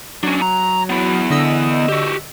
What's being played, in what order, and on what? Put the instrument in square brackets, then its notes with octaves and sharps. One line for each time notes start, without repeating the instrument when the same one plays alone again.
[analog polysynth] F#3 [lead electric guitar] C#4 D4
[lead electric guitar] A#5
B3 E4
[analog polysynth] D3 D#5 E6
[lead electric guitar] F#4 G4